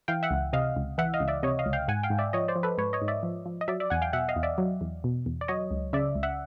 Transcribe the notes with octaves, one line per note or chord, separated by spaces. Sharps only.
E3 F5 G5
E5 F#5
C#2
C3 D#5 F5
C#2
E3 E5 F#5
D#5 F5
C#2
D5 E5
C3 C#5 D#5
D#5 F5
C#2
F5 G5
G#2 F#5 G#5
F5 G5
G#2
D5 E5
F3 C#5 D#5
C5 D5
F3
A4 B4
G#2 B4 C#5
C#5 D#5
G#2
D5 E5
F3
F3
D#5
F#3 D5 E5
D5 E5
E2 F#5 G#5
F5 G5
B2 E5 F#5
D#5 F5
E2
D5 E5
F#3
E2
B2
E2
D5
F#3 C#5 D#5
C#2
C#3 D5 E5
C#2
E5 F#5